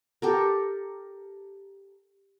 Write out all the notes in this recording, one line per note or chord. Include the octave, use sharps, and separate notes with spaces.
G4 A4 A#4